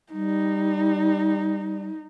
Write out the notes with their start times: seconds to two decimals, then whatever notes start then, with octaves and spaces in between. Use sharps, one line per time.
0.13 G3 D#4